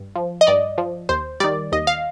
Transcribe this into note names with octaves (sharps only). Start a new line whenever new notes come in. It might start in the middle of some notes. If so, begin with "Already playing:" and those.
Already playing: G2
F3
D#5
G2 D5
F3
D#2 C5
D#3 G3 D5
D#2 D#5
F5